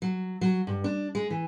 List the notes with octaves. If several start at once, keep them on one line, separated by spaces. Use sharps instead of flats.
F#3
F#3
G2
D4
G#3
E3